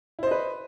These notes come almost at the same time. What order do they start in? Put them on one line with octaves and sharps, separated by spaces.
E4 C5 D#5 B4